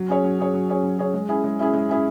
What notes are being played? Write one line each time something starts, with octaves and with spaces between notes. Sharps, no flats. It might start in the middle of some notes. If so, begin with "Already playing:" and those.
Already playing: F#3
C#4 G#4 C#5
F#3
C#4 G#4 C#5
F#3
C#4 G#4 C#5
F#3
C#4 G#4 C#5
G#3
C#4 E4 G#4
G#3
C#4 E4 G#4
G#3
C#4 E4 G#4